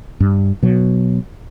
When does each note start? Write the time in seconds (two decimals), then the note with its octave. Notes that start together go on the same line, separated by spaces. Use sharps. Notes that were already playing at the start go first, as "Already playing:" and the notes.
0.20 G2
0.63 B2 F#3